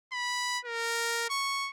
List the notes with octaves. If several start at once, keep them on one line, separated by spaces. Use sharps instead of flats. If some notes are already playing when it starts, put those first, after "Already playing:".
B5
A#4
C#6